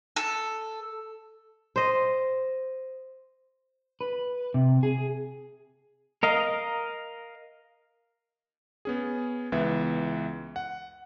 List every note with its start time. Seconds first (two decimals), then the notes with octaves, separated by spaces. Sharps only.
0.16 A4
1.76 C5 D#5
4.01 B4
4.54 C3
4.83 G#4
6.23 A#4 D#5 F5
8.85 B3 C#4 G#4
9.52 C#2 E3 B3 E5
10.56 F#5